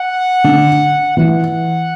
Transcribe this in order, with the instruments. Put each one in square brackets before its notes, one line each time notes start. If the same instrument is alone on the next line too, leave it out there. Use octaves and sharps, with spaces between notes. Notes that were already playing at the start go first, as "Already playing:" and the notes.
Already playing: [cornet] F#5
[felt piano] D3
[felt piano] E3 [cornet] F#5